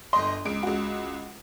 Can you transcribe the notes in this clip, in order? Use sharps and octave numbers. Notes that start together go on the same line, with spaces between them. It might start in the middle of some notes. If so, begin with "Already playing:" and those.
G1 D#5 C6
C#2 D7
C#2 F#4